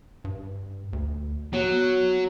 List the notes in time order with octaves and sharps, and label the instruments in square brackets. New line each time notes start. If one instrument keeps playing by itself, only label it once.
[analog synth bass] G2
D2
[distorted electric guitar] F#3 [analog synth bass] B3